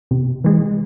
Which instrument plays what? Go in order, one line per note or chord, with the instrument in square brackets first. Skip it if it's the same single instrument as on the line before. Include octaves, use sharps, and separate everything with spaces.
[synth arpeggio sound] C3
E3 G#3